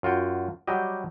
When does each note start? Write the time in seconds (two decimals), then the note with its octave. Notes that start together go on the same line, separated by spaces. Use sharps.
0.03 F#2 F4 F#4 G5
0.67 F#3 G3 G4 D#5